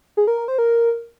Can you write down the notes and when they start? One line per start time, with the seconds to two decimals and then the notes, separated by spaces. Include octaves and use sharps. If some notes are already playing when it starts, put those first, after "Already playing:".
0.17 G#4
0.27 A#4
0.38 A#4
0.48 C5
0.58 A#4